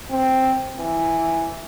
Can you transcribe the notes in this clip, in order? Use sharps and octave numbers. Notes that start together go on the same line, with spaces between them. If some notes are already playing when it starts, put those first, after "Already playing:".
C4
E3